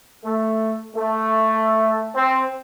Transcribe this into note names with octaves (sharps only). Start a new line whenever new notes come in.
A3
A3
C4